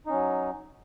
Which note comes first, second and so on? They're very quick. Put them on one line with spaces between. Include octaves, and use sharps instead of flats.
D#4 C#4 F#3